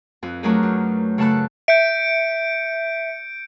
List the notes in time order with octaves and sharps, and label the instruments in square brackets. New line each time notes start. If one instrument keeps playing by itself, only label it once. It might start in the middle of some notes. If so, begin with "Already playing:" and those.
[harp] F2 B4
F#3 A3 D4 G#4 A#4 B4
F#2
C#3 A3 A4 A5 B5 F#6
[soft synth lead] E5 [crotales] G6 C#7 D7